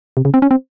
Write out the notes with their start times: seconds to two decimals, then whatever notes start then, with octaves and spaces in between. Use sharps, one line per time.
0.17 C3
0.25 C#3
0.34 C4
0.42 C#4
0.51 C4